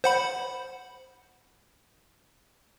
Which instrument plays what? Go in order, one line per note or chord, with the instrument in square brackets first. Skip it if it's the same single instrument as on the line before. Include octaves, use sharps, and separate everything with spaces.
[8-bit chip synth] C5 F#5 B5